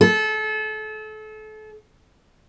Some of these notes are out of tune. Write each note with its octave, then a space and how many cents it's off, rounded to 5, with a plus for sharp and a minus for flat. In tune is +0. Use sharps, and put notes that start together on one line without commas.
A4 -30